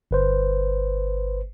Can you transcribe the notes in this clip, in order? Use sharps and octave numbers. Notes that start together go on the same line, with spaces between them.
G1 B4 C5